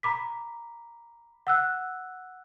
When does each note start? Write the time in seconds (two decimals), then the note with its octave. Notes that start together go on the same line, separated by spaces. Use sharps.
0.03 A#5 B5 D6 B6
1.47 F#5 E6 F#6